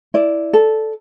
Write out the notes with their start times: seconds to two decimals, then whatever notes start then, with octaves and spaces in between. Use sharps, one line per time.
0.14 E4 D5
0.53 A4